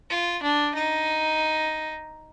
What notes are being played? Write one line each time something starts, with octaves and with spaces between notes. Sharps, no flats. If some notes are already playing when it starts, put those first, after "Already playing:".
F4
D4
D#4